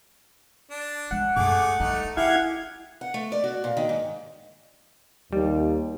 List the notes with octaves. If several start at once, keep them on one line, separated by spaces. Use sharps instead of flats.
D4
G#3 B3 F#5
F#2 A3 G#4 D6
G3 A3 D#4
A3 E4 G4 G#4 F5 F#5 G#6
F#5
A3
D5
F#4
A#2
D#3
G#2
D#2 G3